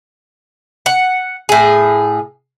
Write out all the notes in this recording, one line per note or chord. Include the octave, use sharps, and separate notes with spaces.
F#5
A2 G#4